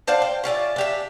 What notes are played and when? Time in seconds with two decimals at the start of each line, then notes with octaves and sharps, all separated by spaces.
0.07 D4 C5 F5 F#5
0.22 G5
0.44 C#4 F4 D5 E5
0.76 D4 G4 E5